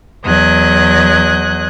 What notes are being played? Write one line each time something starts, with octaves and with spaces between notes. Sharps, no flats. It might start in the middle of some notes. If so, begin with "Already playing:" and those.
E2 F#3 D#5 F#6 G#6